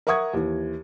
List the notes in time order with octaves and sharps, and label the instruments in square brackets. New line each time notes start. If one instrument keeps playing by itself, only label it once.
[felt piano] A#4 E5 F#5 C#6 D#6 G#6
D#2 E3